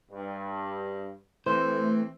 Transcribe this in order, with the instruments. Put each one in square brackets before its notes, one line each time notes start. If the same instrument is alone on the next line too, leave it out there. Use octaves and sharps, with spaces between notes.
[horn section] G2
[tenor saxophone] E3 [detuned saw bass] A3 [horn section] C4 [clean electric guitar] C5